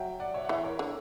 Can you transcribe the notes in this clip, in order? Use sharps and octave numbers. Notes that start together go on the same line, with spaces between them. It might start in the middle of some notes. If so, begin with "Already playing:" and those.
Already playing: F#3 E5 G5
D5 F#5
C#5 E5
F#5
E3 C#5 E5
A#4 C#5
D3